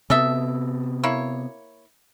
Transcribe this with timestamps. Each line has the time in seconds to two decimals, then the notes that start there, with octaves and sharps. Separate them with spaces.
0.10 C3 B3 A4 D#5 E5
1.03 A#3 E4 C#5